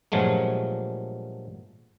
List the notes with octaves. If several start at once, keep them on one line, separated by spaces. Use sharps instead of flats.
G2 A#2 F3 F#3 G#3 A3